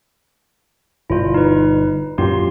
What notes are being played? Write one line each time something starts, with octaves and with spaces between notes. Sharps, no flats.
G1 B2 E4 F4
D#4 B4
F#2 A#2 F#3 F4 G4 C6